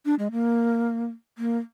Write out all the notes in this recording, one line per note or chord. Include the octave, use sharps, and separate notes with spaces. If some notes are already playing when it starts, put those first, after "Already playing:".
D4
G#3
A#3
A#3